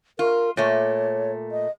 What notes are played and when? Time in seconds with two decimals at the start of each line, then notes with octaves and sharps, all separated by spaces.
0.19 F4 A#4
0.57 A#2 A3 C#5
1.52 D#5